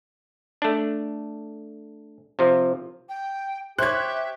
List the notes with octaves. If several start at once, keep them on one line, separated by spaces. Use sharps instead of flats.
A3 D4
C3 F3
G5
G4 C5 C#5 E5 F#6 G#6